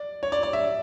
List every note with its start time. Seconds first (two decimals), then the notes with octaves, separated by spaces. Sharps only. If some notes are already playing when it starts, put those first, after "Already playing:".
Already playing: D5
0.23 C#5
0.32 D5
0.43 D5
0.53 E5